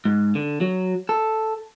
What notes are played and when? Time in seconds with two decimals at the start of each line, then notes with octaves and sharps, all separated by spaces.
0.05 G#2
0.35 D3
0.61 F#3
1.09 A4